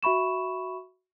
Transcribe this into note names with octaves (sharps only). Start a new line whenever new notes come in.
F#4 E5 B5 C#6 E7